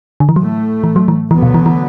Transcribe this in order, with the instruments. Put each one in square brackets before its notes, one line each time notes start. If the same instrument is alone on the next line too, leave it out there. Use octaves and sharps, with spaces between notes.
[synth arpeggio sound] D3
E3
[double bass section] A2 A3 [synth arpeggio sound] F#3
[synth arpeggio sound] E3
F#3
E3
[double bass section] D2 D3 F#3 B3 [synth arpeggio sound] E3
[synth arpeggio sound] B2
E3
E3